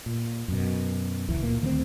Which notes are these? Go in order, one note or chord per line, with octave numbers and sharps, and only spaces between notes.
A#2
F#2 B2
F1 C#2 E3
A#2 A#3
D2 D#3 G3 C4